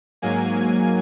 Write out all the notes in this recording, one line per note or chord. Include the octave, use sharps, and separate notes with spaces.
G#2 F#3 A#3 G#5